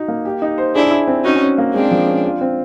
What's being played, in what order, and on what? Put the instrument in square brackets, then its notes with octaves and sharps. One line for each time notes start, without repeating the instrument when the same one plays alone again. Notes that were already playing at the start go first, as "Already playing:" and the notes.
Already playing: [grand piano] D#4 F#4
A#3
G4
D#4
C5
[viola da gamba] D4 E4 [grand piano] G#4
[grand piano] E4
C4
[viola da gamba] C#4 D#4 [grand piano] F#4
[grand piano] C#4
A#3
[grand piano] G#3 [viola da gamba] C4 D4
[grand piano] F3
C#4
F4
C4